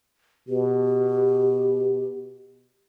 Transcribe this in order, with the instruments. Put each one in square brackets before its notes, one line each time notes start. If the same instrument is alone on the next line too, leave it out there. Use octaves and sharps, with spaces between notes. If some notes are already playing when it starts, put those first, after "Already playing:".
[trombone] B2 [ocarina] G4